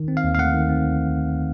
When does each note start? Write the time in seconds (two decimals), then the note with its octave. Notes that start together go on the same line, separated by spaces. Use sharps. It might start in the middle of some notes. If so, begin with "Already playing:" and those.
Already playing: D#3
0.08 C4
0.17 F5
0.24 D#2
0.35 F5
0.39 A3 F#5
0.54 D#3
0.69 C4